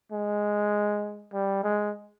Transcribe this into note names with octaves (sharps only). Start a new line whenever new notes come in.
G#3
G3
G#3